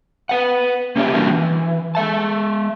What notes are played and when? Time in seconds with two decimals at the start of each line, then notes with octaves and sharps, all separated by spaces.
0.29 B4 F#5
0.96 A#3 C#4 D4 G4 D5 E5
1.14 E3 G3 C4 D4 F#4 A#4
1.30 E3
1.95 G#3 E5 A5